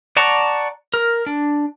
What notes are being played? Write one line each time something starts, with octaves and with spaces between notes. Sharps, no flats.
D5 F#5 A5 A#5 C#6
A#4
D4